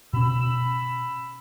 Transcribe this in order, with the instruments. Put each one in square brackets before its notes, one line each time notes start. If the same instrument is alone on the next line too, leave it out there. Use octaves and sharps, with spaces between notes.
[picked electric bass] B2 C#4 [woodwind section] B5 E6